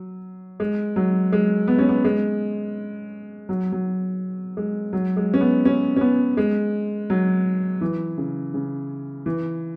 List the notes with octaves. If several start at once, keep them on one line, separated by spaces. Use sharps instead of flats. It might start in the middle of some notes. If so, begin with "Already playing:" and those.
Already playing: F#3
G#3
F#3
G#3
B3
C#4
B3
G#3
F#3
F#3
G#3
F#3
G#3
C#4
B3
C#4
C#4
B3
G#3
F#3
E3
C#3
C#3
E3